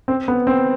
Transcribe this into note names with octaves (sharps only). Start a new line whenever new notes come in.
C4
B3
C4